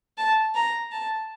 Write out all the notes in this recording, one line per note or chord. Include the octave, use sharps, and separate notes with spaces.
A5
A#5
A5